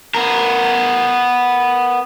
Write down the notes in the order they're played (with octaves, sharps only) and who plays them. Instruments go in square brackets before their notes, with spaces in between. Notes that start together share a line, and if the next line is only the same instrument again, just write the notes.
[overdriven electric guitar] B3 A#4